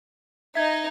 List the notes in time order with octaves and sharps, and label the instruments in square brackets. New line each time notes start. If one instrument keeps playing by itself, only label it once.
[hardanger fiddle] D#4 D#5 [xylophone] E5 G#6